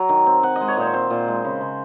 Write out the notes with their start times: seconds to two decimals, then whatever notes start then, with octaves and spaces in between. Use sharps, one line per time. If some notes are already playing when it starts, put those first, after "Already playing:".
Already playing: F#3 A#5
0.09 D#3
0.26 C4
0.43 C4 F#5
0.56 D#5
0.61 G#3
0.68 C#5
0.77 A#2 C5
0.94 C4 C5
1.10 A#2
1.28 G#3
1.45 C#3
1.61 C#3